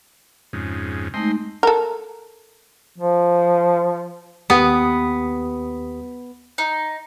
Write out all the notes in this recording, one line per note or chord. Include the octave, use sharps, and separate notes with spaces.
F2 G#2 C#3
G#3 A3 C4 D#4 D#5 C6
A4 A#4
F3
D#2 B3 G4 D#6
D#4